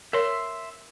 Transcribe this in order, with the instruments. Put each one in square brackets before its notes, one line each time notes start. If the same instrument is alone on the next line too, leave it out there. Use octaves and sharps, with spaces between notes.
[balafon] A#4 C#5 [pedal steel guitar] E5 C6